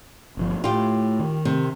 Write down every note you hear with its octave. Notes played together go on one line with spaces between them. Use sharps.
G1 D3 F3
A2 F4 G4
D#3
C3